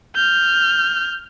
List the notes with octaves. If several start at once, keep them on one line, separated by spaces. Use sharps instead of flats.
F6 G6